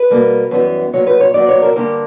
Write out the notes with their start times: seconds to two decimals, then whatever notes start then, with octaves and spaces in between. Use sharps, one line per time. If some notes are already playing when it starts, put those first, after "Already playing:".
Already playing: B4
0.10 B2 G3 A#3
0.51 F#2 E3 G3 B3
0.93 A#2 F#3 B3 C#5
1.07 B4
1.20 C#5
1.34 A#2 F#3 B3 D5
1.48 C#5
1.62 A#4
1.76 G2 D3 G3 A#3 G4